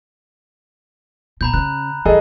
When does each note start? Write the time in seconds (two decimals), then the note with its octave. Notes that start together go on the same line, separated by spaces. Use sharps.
1.41 B2 A#5 B5 G6
1.54 C#3 F#6
2.05 E3 G3 G#4 A4 D#5